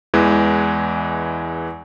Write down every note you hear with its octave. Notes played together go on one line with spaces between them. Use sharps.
E2 E3 G#3